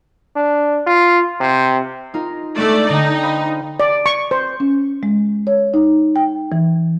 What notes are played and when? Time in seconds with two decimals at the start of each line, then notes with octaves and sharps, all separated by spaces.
0.36 D4
0.86 F4
1.40 C3
2.14 D#4 F4 A#4
2.58 G#3 A3 B3 D4 D5
2.89 D3 D#4 G5
3.23 C5 F5 B5
3.80 D5
4.06 C#6
4.31 C5
4.60 C#4
5.03 G#3
5.47 C#5
5.74 D#4
6.16 G5
6.52 E3